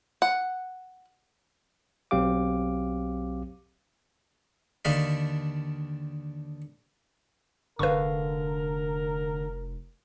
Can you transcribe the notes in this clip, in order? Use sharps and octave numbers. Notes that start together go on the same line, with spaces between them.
F#5
B1 F#3 C4 G4 F5 D6
D#2 D3 D4 D#4 F5 B5
F1 D3 A#4 B4 F5 C#6